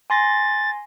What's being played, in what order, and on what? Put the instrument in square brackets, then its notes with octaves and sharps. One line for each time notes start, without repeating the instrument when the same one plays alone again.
[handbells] G#5 C6 A#6 [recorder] A6